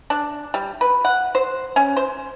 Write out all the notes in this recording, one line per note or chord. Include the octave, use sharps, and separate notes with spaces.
D4
G3
B4
F#5
C5
C#4
C5